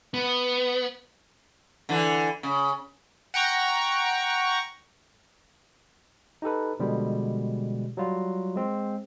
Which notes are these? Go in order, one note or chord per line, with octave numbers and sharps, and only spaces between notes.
B3
D3 E3
C#3
F#5 G5 A#5 C#6
D#4 G4 A4 B4
B2 D3 F3 G3 G#3
F#3 G3 F4
G#3 C4